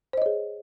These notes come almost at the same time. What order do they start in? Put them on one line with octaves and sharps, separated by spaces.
C5 D#5 C#5 G#4